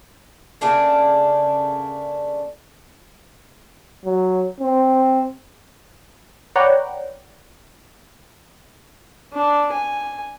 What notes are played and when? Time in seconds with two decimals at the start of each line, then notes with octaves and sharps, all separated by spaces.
0.61 C#3 A3 A#3 D4
4.06 F#3
4.60 C4
6.56 B4 C#5 D5 F#5 G5 A#5
9.33 D4
9.73 G#5